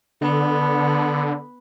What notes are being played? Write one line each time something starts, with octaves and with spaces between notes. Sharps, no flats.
D3 B3